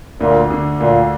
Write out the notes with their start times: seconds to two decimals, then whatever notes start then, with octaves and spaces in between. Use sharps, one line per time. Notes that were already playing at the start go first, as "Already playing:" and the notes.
0.20 D2 A#2
0.51 D3
0.80 D2 A#2